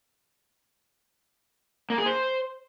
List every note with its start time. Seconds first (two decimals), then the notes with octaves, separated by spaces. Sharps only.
1.90 A#3
1.98 G#4
2.06 C5